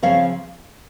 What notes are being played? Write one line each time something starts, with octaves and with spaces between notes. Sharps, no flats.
C#3 F3 C4 C#5 F5